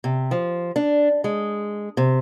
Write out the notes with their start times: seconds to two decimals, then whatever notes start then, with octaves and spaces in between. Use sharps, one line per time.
0.04 C3
0.31 F3
0.76 D4
1.24 G#3
1.97 C3